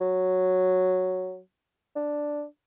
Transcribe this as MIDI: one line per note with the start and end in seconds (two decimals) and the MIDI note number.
0.01 1.39 54
1.96 2.43 62